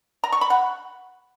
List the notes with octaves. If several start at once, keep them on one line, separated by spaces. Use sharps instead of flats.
A#5
C#6
B5
F#5